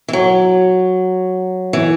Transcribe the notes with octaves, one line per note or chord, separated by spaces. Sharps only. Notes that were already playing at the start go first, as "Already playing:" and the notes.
E3
F#3
E3